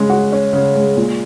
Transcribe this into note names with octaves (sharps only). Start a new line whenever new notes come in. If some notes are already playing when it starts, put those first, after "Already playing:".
Already playing: C#3 G#3 C#4
F#4
C#4
C#3
G#3
A#2